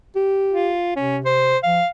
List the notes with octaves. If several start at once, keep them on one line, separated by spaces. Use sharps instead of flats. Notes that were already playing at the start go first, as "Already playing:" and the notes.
G4
F4
C3 C#4
C5
F3 F5